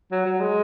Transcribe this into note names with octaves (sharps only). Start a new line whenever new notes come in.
F#3
F#3
G#3